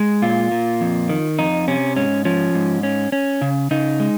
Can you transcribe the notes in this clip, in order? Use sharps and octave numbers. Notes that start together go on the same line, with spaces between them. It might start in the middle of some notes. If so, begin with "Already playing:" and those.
Already playing: G#3
A#2 F4
A#2
F2
D#3
F2 D#4
C3 C#4
G#2 C#4
F3 C#4
G#2
C#4
C#4
C#3
C#3 D#4
G#3